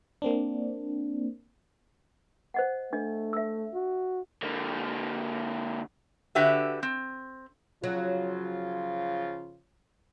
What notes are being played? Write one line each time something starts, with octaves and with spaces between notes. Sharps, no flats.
A#3 C4 D4
C5 D#5 F#5
A3 D4 D#5
E5 E6
F#4
D3 A#3
D3 F#4 G4 B4 E5
C4
C#3 F3 F#3 F4